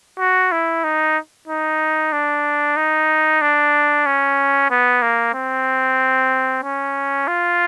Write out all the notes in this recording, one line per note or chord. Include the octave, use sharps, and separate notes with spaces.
F#4
E4
D#4
D#4
D4
D#4
D4
C#4
B3
A#3
C4
C#4
F4